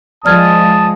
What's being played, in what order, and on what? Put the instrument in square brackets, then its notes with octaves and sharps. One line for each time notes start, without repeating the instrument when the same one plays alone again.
[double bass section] F3 G#3 [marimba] D5 F6 G#6 [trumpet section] A5 D#6